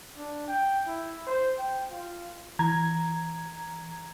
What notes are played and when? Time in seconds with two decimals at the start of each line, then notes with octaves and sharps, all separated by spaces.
0.17 D4
0.48 G5
0.87 E4
1.27 C5
1.59 G5
1.91 F4
2.59 E3 A#5 G#6